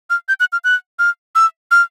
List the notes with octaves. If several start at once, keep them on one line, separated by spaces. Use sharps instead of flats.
F6
G6
F#6
F6
F#6
F6
E6
F6